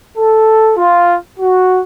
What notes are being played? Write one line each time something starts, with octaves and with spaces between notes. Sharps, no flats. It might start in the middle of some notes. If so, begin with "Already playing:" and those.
A4
F4
F#4